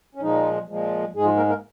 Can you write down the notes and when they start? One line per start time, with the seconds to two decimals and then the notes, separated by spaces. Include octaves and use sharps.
0.15 C#4
0.22 A#2 F3 G#3 D#4
0.68 A#2 F3 G#3
1.14 G#2 G#3 G#4
1.25 F3 F4
1.37 A#3 A#4
1.49 A#3 A#4